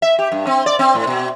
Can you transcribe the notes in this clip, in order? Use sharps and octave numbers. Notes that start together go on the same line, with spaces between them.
E5
G4
G2
C4
D5
C4
A2
B2